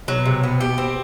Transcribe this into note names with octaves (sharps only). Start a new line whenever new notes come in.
B2 F#3
C3
B3
G4
C4